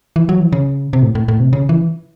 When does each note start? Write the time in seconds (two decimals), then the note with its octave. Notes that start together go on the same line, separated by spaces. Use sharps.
0.16 E3
0.29 F#3
0.40 E3
0.52 C#3
0.93 C3
1.03 A2
1.15 A2
1.28 A2
1.40 C3
1.53 C#3
1.69 E3